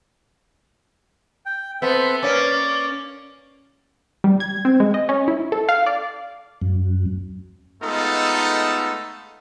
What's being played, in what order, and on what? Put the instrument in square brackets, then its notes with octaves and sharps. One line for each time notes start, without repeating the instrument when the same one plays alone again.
[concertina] G5
[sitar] B3 [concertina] C4 A4 E5
[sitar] A#3 C#4 [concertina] D5
[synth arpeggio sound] G3
G#6
C4
G#3
D#5
C#4
E4
A4
F5
D5
[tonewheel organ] F#2
[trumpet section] G#3 A3 B3 D#4 F4 A4